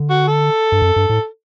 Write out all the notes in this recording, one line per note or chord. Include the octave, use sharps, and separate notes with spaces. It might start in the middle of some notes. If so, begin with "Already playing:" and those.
Already playing: D3
F#4
A4
G2
F#2
G2
A2